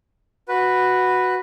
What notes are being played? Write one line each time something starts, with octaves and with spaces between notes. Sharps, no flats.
F#4 B4